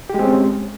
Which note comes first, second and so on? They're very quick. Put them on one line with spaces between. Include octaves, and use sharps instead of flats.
G4 G#3 C4 C#4